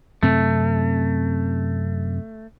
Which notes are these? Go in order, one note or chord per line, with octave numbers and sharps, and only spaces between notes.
F#2 C3 A3 C4